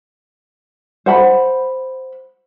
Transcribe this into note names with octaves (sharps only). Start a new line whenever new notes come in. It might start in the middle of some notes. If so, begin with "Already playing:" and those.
C5 F#5 B5